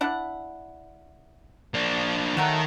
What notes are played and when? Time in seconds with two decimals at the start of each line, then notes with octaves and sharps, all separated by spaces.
0.01 D4 E4 F#5
1.74 A#3 D4
2.37 D#3 F#3 A3 F#4 A#4